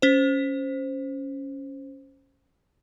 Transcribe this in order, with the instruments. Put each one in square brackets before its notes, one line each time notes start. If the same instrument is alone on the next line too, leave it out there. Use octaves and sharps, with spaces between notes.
[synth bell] C#4 C5